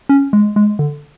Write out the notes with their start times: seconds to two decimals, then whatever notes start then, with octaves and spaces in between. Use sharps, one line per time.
0.09 C#4
0.33 G#3
0.56 G#3
0.79 D3